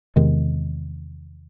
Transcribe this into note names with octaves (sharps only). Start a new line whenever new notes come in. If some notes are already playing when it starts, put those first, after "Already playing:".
E2 C3 D#3 G#3